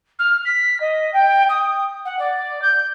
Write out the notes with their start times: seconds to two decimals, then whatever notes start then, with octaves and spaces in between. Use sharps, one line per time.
0.19 F6
0.45 B6
0.80 D#5
1.13 G5
1.49 D#6
2.05 F#5
2.19 D5
2.62 G6